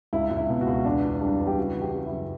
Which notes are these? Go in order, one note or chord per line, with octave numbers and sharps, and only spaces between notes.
C#2 E4
C#2
E4
B2
F#4
C#2
E2 D4
E2
G3 D4
E2
G4
C#3 F#4
E3
G4
C#3
E4
F#2